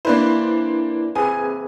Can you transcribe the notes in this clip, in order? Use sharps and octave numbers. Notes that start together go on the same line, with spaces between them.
A#3 D4 E4 B4 C5
C4 G#4 B4 G#5